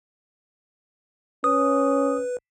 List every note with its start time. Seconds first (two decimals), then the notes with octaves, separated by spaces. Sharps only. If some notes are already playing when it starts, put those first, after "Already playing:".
1.44 C#4 B4 D#6